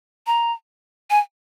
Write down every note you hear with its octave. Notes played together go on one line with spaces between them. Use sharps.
A#5
G#5